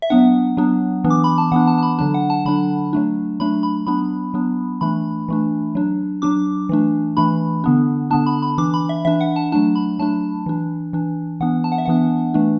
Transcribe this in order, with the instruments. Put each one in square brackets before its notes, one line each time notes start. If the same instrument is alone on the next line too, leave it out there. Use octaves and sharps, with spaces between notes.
[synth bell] E5
F#3 B3 D4 F#5
F#3 B3 D4
E3 B3 D4
D6
B5
A5
E3 B3 D4 F#5
A5
A5
B5
D3 F#3 D4 A5
F#5
A5
D3 F#3 D4 B5
F#3 A3 D4
F#3 A3 D4 B5
B5
F#3 B3 D4 B5
F#3 B3 D4
E3 A3 D4 B5
E3 A3 D4
F#3 D4
F#3 D4 D6
E3 A3 D4
E3 A3 D4 B5
D3 B3 D4
D3 B3 D4 A5
B5
B5
E3 D4 D6
B5
E5
E3 D4 E5
F#5
A5
F#3 A3 D4 A5
B5
F#3 A3 D4 A5
E3 D4
E3 D4
E3 B3 D4 F#5
A5
F#5
E5
E3 B3 D4 F#5
E3 A3 D4